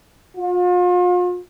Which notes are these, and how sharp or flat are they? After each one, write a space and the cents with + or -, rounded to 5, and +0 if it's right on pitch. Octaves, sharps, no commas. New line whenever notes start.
F4 +40